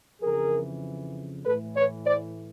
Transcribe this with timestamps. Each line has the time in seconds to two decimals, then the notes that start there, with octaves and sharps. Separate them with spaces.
0.21 F2 C#3 E3 G#4 A#4
1.45 A2 E3 A4 B4
1.75 B4 C#5
2.06 C5 D5